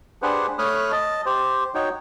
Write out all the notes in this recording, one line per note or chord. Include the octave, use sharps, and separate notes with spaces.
D4 G4 G#4 B4 C5 F#5
A3 C#5 B5 D#6 F6 F#6
D#5 A5
G4 C5
D#4 F#4 C#5 G5